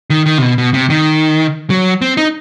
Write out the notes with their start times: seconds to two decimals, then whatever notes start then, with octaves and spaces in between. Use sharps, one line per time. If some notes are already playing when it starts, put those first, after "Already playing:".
0.10 D#3
0.26 D#3
0.38 C3
0.42 B2
0.58 B2
0.74 C3
0.90 D#3
1.70 F#3
2.02 C4
2.17 D#4